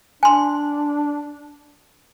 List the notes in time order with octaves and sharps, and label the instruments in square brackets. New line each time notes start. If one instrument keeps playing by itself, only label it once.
[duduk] D4 [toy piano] G#5 C6